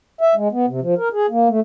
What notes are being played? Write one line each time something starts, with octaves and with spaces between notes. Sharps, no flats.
E5
G#3
B3
C3
F3
A#4
G#4
A#3
A3